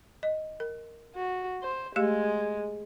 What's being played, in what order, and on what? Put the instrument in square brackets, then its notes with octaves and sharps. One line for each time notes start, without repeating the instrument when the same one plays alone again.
[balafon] D#5
A#4
[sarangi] F#4
C5
[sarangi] G#3 [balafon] A3 G4 F5